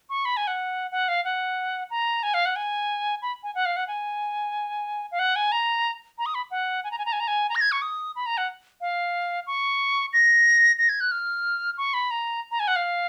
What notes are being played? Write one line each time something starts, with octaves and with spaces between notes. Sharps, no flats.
C#6
B5
G#5
F#5
F#5
F5
F#5
A#5
G#5
F5
F#5
G#5
B5
G#5
F#5
F5
F#5
G#5
F5
F#5
G#5
A#5
A#5
D#6
B5
F#5
G#5
A#5
G#5
A#5
G#5
A#5
G#5
A#5
A#6
G#6
C#6
D#6
B5
A#5
F#5
F5
C#6
A#6
A#6
G#6
F#6
F6
C#6
B5
A#5
A#5
G#5
F#5
F5